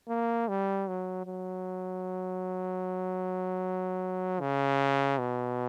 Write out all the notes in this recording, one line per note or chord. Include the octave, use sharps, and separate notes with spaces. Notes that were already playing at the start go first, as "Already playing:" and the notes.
A#3
G3
F#3
F#3
C#3
B2